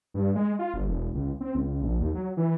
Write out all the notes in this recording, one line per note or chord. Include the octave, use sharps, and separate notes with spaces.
G2
G#3
F4
G1
E1
C#2
C4
C#2
A#1
D#2
F#3
E3